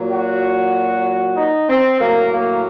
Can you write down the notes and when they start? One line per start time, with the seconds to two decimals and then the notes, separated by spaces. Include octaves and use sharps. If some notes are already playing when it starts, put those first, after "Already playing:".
Already playing: A#2 F#3
0.10 F#4
1.36 D#4
1.68 C4
1.99 A2 F#3 A#3
2.32 A#3